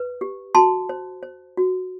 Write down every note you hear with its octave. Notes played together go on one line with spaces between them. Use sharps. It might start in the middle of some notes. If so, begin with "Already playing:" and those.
Already playing: B4
G4
F#4 A5 C6
C5
C5
F#4